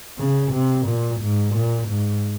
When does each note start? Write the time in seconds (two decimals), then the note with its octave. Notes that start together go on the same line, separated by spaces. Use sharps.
0.19 C#3
0.52 C3
0.87 A#2
1.21 G#2
1.55 A#2
1.89 G#2